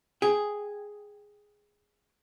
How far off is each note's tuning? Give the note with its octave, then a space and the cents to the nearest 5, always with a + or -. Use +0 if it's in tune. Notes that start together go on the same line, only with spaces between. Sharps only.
G#4 +0 G5 +10